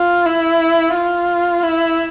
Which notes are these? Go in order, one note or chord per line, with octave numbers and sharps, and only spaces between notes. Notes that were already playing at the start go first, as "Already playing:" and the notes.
Already playing: F4
E4
F4
E4